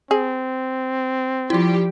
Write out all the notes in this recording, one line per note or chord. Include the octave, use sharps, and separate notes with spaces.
C4 G#4
F3 G3 E4 F4 G4